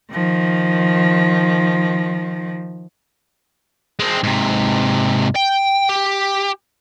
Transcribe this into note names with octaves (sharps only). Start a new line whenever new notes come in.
D#3 F3
G#3 C4
G#2 C3
G5
G4